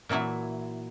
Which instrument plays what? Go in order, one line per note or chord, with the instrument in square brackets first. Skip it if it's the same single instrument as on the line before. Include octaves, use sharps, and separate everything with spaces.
[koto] A#2 E3 F#3 E4